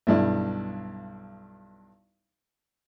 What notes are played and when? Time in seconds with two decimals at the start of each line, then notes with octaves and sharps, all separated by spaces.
0.07 B1 G2 E4